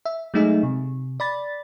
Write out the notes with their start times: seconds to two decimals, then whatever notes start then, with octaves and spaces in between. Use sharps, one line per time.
0.05 E5
0.34 F#3 G#3 A3 D#4 G#4 E5
0.63 C3
1.20 D5 B5 A6